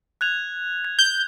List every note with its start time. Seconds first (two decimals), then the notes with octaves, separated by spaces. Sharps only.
0.21 F#6 G#6 F7
0.85 G#6
0.99 G6